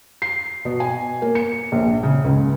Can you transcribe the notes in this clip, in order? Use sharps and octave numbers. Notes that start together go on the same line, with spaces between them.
C7
B2
G#5
A#3
C#7
A#1
C#3
C#2